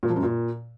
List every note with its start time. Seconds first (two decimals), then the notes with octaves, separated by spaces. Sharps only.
0.03 A#2
0.09 F3
0.16 F#2
0.23 A#2